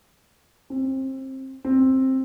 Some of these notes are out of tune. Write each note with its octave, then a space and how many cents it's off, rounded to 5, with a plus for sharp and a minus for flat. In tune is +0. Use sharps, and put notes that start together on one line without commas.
C4 +25
C4 +10